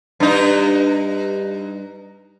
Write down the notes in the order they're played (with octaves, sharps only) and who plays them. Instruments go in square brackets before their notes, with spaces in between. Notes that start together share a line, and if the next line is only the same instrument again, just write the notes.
[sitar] G2 D#4